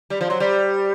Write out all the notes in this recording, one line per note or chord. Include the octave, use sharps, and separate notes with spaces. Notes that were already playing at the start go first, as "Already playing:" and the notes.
G3
F3
F#3
G3